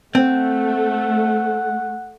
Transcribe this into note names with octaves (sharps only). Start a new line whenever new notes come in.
A3 C4 F#5